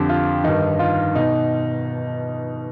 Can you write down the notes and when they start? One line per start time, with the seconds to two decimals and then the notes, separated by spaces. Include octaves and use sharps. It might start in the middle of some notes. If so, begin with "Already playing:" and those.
Already playing: F2 D3 F3 G4
0.09 F4
0.44 G2 D#3 D#4
0.79 F4
1.15 B2 D#4